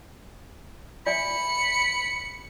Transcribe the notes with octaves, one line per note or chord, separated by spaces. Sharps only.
D5 E5 G#5 B5 C#7